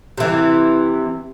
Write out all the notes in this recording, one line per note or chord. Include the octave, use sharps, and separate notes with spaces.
C3 E3